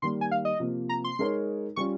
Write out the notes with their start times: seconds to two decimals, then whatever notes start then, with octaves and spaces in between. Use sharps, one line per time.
0.02 D#3 G3 A#3 C6
0.21 G#5
0.31 F5
0.45 D#5
0.60 C3 F3 A#3
0.89 A#5
1.04 C6
1.19 G#3 D#4 A#4 C#5
1.76 G3 C#4 F4 C#6